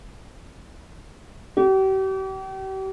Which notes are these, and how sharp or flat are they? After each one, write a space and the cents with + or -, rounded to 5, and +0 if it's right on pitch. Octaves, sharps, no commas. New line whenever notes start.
G4 -40